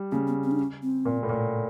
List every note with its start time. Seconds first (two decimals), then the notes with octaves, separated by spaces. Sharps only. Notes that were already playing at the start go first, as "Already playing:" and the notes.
Already playing: G3
0.11 C#3 A#3
0.27 B3
0.43 C4
0.51 D4
0.59 C#4
0.82 C4
1.05 A#2
1.23 A2
1.29 A#2